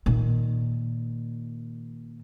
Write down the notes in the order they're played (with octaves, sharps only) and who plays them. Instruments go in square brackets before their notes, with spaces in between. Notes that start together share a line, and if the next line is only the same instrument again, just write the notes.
[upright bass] A#2 D#3